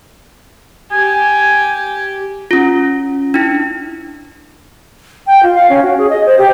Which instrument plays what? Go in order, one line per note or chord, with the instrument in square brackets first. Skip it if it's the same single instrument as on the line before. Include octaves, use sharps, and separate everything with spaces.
[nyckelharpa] G4 [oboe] G#5
[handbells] C#4 F4
D4 E4
[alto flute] G5
F4
F5
C#4
F#4
G#4
D#5
C5
G4